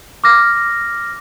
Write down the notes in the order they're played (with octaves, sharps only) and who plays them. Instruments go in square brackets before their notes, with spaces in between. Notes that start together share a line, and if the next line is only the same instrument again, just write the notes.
[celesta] D6 F6 A#6